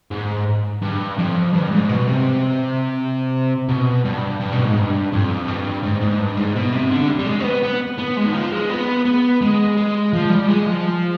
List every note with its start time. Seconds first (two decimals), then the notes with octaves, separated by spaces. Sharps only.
0.11 G#2
0.82 G2
1.18 F2
1.54 G2
1.72 G#2
1.89 B2
2.07 C3
3.69 B2
4.05 G2
4.40 G2
4.52 B2
4.65 G#2
4.76 G2
5.12 F2
5.48 G2
5.83 G#2
6.01 G#2
6.19 G2
6.37 G#2
6.55 B2
6.73 C3
6.91 D3
7.08 G3
7.19 G3
7.27 G#3
7.40 C4
7.44 B3
7.63 B3
7.98 B3
8.17 G#3
8.26 D#3
8.34 F3
8.52 G#3
8.70 B3
9.05 B3
9.42 G#3
9.77 G#3
10.13 F3
10.30 G3
10.48 G#3
10.66 F3